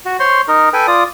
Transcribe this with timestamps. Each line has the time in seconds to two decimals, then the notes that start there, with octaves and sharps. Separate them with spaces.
0.06 F#4
0.20 C5 C#5 C6
0.48 D#4 A#4
0.73 A4 B4 G5 G#5
0.87 F4 D5 D#6